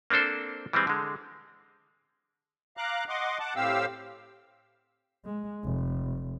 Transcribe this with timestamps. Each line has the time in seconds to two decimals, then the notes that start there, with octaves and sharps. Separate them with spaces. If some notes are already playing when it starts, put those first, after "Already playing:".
0.10 A#3 C4 D4 A4 C5
0.73 E3 G3 G#3 C4
0.87 D3 G#3
2.77 F5 A#5 D6 F#6
3.09 D#5 F#5 C6 D6
3.39 F#5 A5 D6
3.56 A2 C4 G4 F5 E6
5.25 G#3
5.64 F1